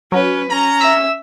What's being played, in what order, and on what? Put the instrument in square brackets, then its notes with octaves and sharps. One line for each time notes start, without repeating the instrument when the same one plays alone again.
[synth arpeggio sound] F#3 [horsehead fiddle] C#4 B4
[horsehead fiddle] C#4 [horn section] A#5
[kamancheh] E5 E6 [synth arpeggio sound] B6